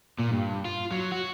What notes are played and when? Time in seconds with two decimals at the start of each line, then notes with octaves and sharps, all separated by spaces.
0.19 A#2
0.31 G2
0.65 F4
0.92 F#3
1.12 F#4